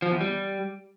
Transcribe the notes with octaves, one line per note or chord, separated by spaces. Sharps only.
F3
E2
G3